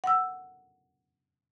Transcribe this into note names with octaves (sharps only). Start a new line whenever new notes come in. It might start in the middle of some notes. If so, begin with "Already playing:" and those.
F#5 E6